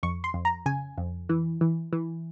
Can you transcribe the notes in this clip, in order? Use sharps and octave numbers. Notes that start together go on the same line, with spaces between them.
F2 C#6
C6
F2
A#5
C#3 G#5
F2
E3
E3
E3